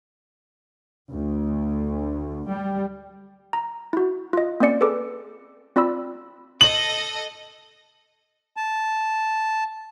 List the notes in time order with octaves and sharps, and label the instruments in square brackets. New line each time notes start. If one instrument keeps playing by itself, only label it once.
[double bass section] D2
G3
[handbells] A#5
E4 F#4
F4 D#5
A#3 C4 C#4 D5 C#7
G#4 A4 B4 D6
C4 F4 D5 B5 E6
[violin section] A4 D#5 [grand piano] F#7
[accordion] A5